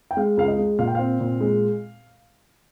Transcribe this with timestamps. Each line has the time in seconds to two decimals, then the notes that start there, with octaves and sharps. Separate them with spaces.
0.11 G5
0.17 G#3 F5
0.37 C#2 F5
0.48 D#5
0.59 G#3
0.79 A#2 F5
0.88 G5
0.95 C4 F5
1.20 A#2
1.41 G#3